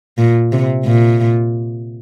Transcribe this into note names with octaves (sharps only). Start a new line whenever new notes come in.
A#2
C3
A#2